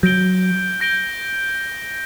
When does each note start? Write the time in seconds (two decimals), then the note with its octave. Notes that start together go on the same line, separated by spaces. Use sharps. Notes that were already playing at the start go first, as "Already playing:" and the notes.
0.03 F#3 G6 A#6 D7 G7
0.80 G6 A#6 D7 G7